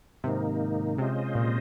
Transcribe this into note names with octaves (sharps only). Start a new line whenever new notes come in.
G#2 C3 D#3 A#3 D#4
C3 G#3 C#4 F4 C5 D#5
A#2